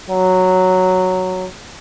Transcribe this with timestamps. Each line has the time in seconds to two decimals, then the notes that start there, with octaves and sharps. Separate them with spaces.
0.10 F#3